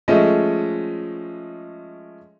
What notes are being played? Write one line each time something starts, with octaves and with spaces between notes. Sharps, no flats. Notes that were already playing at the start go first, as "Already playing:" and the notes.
F3 G#3 A3 C#4 D#5